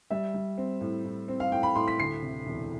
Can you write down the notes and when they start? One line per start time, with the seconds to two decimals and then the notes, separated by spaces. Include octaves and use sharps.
0.11 G3 E5
0.34 G3
0.58 C4
0.81 A2
1.05 A2
1.28 C4
1.40 F5
1.52 A2 G5
1.63 B5
1.75 A2 C6
1.88 B6
1.99 D2 C7
2.22 C3
2.46 E1